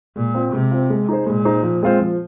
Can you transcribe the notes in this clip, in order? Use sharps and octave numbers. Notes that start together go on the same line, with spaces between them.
A#2 G#3
C4 F4
C3 G#3
C4 F4
G#3
D#4 G#4 C5
A#2 G#3
D#4 G#4 C5
F3
G#3 C4 F4 C5
F3